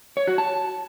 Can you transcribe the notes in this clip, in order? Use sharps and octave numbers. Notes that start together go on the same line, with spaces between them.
C#5
F#4
A5